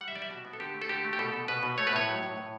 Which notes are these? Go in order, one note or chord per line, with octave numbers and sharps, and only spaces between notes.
G3 F#5
E5
G3 D5
E5
B2 F#4
B3
A4
D3 G4
A3
A4
D3 G4
A3
G4
B2 A4
B2
B2 B4
B2
A3 C#5
B4
A2 C#5
F#3
A2
A2